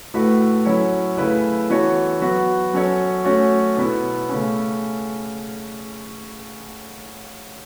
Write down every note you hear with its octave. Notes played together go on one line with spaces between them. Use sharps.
A2 A3 F#4 B4
F#3 C#4 E4 C#5
C#3 A3 E4 B4
E3 B3 F#4 A4 C#5
F#3 B3 F#4
F#3 C#4 A4 C#5
A3 C#4 F#4 C#5
B2 B3 E4
C#3 A3 C#4